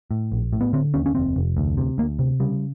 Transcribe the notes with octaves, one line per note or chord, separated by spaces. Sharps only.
A2
A#1
A2
B3
D3 C4
D#2 C#4
C#4
F1 C4
F1
D2
C3
D2 A#3
C3
C#3 G3